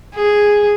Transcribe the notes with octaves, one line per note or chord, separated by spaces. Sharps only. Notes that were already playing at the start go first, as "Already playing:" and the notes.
G#4